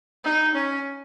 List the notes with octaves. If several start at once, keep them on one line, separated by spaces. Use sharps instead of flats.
D#4
C#4